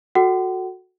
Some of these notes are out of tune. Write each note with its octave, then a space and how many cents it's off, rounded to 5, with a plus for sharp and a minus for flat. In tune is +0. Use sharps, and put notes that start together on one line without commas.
F#4 -10 A4 +0 F#5 +40